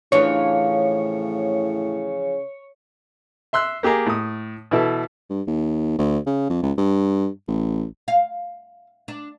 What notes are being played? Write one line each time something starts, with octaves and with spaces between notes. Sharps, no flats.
A2 C#3 E3 F3 D4 C#5
E5 C6 E6 F#6
A#3 G4 G#4 A#5
A2 D#6
B2 E3 E4 A4
G2
D#2
D2
C#3
F2
C#2
G2
A1
F5
D4